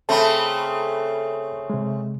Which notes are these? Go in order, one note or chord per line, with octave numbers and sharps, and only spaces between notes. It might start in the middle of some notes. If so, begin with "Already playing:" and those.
C#3 A3 C4 A5 B5
C3 G#3